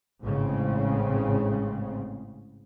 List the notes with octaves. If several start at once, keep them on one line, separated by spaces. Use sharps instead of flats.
A1 G#2 C#3 C4